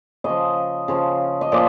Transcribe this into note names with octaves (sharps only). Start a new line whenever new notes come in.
C#3 F3 D#5
C#3 F3
D#5
A#2 F3 D5